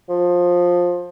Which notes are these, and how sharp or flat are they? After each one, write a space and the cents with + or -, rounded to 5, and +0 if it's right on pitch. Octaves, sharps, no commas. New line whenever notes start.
F3 +15